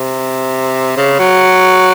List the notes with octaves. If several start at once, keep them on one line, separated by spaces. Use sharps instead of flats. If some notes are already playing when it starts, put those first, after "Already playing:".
Already playing: C3
C#3
F#3